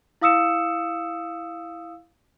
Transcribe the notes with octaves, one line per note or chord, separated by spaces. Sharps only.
E4 F5 D#6 E6 C#7 E7